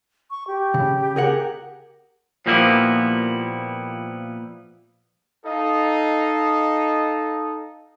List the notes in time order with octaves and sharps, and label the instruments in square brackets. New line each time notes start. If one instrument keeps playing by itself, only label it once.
[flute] C#6
G4
[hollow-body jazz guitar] C#3
G#4 A#4 F#5
[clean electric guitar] A#2 F3 G3 A#3 B3 E4
[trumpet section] D#4 A4 D#5 F5